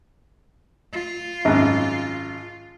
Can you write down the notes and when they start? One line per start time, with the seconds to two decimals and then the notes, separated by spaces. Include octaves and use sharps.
0.93 F4
1.45 G#1 F#2